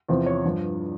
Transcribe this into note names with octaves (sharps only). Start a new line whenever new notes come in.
E2 C3 F3 C5
C#5
G2 F3